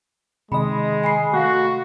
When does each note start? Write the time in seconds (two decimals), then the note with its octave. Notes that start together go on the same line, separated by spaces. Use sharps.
0.52 C3 D#3 G#3 D#5 B5
1.04 G#5 B5 C7
1.34 A3 F#4 F5 F#6